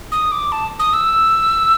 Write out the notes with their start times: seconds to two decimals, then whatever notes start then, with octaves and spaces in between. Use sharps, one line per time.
0.12 D#6
0.32 D6
0.52 A5
0.79 D#6
0.93 E6